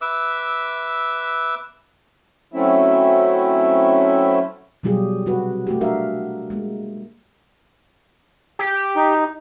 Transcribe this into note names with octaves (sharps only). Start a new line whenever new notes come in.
B4 E5 D6 E6
F#3 A3 C4 C#4 E4 E5
B2 F#3 G3 F4 G4 G#4
C3 F#4 B4
A3 F#4 G4
D4 F#4 A#4 E5 F5
G#3 A#3
G4
D#4